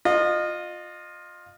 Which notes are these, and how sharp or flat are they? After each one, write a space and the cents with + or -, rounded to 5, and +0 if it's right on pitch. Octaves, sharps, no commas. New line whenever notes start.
F4 +15 D#5 -25